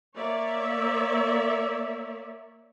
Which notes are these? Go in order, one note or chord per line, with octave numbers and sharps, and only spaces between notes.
A#3 C#5 D5 E5